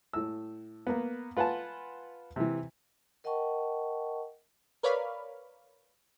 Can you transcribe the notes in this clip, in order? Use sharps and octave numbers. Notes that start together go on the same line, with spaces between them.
A2 E6
A#3 B3
F4 B4 F#5 G#5 A5
C3 E3
A#4 D#5 F#5 G5 A5 C#6
A#4 B4 C#5 D5 F5 B5